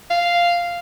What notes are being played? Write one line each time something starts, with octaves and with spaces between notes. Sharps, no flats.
F5